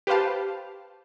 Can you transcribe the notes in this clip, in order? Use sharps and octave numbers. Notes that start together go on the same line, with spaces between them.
G4 B4 C5 F5 A5